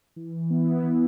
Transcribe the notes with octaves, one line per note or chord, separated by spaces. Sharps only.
E3
B3 E4
E3